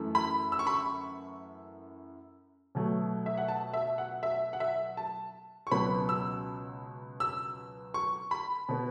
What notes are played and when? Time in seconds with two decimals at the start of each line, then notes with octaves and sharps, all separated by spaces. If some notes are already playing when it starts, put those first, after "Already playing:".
Already playing: F#2 E3 A3
0.15 B5
0.52 E6
0.59 C#6
0.67 B5
0.74 C#6
2.75 B2 F#3 A3
3.26 E5
3.37 F#5
3.48 A5
3.73 E5
3.98 F#5
4.23 E5
4.53 F#5
4.60 E5
4.97 A5
5.67 C#6
5.71 C#2 B2 F#3 B3 B5
6.09 E6
7.20 E6
7.94 C#6
8.31 B5
8.69 B2 B3